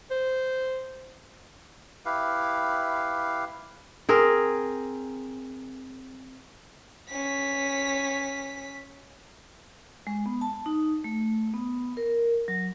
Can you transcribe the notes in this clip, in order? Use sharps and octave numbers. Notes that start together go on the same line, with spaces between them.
C5
E4 G4 B4 F5
C4 G#4 A#4
C#4 B6
G#3
B3
A5
D#4
A3
B3
A#4
F#3